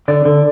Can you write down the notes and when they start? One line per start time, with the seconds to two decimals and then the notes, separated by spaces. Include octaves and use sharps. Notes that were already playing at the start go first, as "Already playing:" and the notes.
0.08 D3 D5
0.25 D3